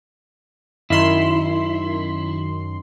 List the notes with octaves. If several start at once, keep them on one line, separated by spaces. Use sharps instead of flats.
F#2 D#3 E4 C6